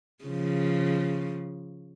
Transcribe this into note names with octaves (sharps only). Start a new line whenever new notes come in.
C#3 F3